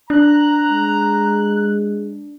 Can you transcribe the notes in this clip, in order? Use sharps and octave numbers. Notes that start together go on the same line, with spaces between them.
D4 A#5 F#6
G#3